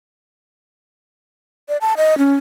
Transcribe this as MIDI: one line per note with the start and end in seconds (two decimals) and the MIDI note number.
1.69 1.77 74
1.81 1.94 81
1.97 2.17 75
2.18 2.36 61